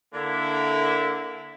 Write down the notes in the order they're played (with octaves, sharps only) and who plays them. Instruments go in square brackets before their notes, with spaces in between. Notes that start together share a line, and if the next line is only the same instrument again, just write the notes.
[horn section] D3 A#3 E4